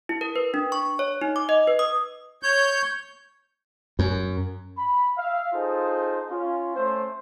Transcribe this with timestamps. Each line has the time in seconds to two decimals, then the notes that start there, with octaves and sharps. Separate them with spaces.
0.09 E4
0.21 A#4
0.36 B4
0.54 D4
0.72 C#6
0.99 C#5
1.21 D#4
1.36 D6
1.49 D#5
1.67 B4
1.79 D#6
2.43 C#5 G6
3.99 F#2
4.77 B5
5.17 E5 F5
5.53 D#4 F4 G#4 A4 C5
6.30 C#4 F4
6.76 A3 C#4 C5